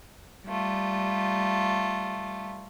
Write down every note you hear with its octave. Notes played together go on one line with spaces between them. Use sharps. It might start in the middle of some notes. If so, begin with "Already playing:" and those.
G3 A3 F4